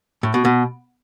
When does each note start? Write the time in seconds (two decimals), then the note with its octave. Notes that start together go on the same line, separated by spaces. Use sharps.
0.23 A2
0.34 B2
0.45 B2